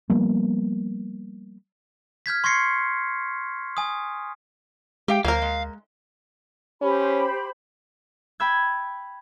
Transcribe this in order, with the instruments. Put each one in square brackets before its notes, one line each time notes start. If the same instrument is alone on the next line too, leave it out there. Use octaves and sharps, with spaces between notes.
[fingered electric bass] F3 G3 A#3 B3
[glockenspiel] F6 G6 G#6 B6
C6 C#6 G#6 A#6 C7 C#7
G#5 D#6
[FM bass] G#3 [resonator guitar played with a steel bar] G4 F5 G5
[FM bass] D2 [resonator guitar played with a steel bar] F#3 C5 [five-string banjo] A#3 A#4 [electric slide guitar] F5
[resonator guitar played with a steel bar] G#3
[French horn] C#4 [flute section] G4 C5 B5
[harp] G5 B5 E6 G#6